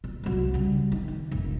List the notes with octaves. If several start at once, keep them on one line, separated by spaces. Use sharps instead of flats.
A#2
C2 F#3
C#3 G3
D#3
D#3
F1 A#1